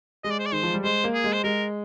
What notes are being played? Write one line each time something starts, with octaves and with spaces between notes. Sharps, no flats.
G#3 D#5
D5
C5
D5
D#3 C5
F3
G3
G#3 C5
A#3
G#4
G#3
C5
G#3 A#4